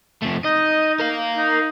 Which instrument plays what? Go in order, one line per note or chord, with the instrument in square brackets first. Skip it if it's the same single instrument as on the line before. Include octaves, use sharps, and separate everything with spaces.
[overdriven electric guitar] F2 A3
[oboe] D#4 [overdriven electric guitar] D#5
[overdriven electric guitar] A#4 F5
[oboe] D#4